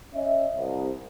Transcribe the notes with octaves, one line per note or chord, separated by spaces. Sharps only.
C#4 D#5 E5
C2